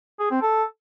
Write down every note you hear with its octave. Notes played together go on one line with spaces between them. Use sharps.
G#4
C4
A4